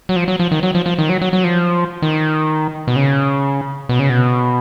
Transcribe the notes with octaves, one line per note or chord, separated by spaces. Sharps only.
F#3
F3
F#3
F3
D#3
F#3
F3
F3
D#3
F#3
F#3
F#3
F3
D#3
B2
C#3
B2
C#3
B2